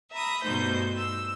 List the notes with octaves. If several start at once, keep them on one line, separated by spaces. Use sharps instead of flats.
E5 A#5 B5 D#6
G2 B2 A3 D#4 C5 G6
E6